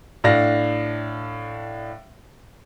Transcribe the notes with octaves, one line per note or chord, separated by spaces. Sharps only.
A2 D4 F5 A#6